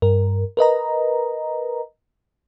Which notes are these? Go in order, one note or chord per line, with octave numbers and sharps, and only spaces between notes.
G2 A#4
A#4 B4 D#5 A#5